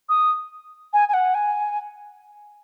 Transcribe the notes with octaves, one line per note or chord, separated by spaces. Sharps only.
D#6
G#5
G#5
F#5
G#5